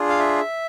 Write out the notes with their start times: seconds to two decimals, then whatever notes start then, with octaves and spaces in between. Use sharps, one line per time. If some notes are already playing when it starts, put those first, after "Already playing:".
Already playing: D4 F4 G#4
0.09 F5
0.19 E5